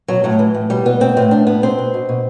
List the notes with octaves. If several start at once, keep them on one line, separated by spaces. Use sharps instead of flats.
B2 F#3
A2 F#3
E3
A2
B2 G3
B2 B3
B2 C4
A2 C4
A2 D4
A2 B3
B2 C4
B2
B2
B2